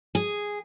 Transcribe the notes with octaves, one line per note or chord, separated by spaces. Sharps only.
G#4